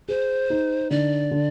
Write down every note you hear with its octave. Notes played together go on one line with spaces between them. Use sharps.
G#4 C5
D#4
D3 D5
D3